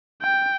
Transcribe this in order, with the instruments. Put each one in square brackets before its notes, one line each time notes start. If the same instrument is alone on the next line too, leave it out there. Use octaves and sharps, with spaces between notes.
[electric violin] G5